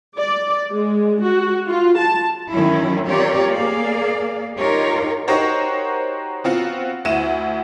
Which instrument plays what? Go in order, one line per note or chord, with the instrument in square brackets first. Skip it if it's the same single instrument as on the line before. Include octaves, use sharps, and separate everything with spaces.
[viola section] D5
G#3
F#4
F4
A5
[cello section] D#3 E3 F#3 C#4 E4
C4 F4 G4 A#4 C#5 D5
A#3 G#4 D5 F5
D#4 F4 G4 A#4 C#5
[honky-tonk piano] D#4 F#4 G4 A#4 C5 C#5
B3 C4 F4 F#4
D2 E4 D#7 E7